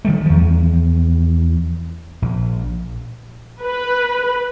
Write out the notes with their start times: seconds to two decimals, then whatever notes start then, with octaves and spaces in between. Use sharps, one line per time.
0.05 D#3 G3 A3
0.26 E2 F3
2.22 A#1
3.63 B4